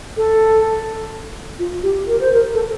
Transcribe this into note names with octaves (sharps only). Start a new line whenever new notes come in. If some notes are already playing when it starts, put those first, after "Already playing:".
A4
F4
G4
A#4
C5
A#4
A4